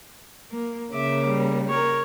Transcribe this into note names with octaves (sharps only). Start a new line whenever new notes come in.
A#3
C#3 A#3 E5 D6
G3
A#4 C#5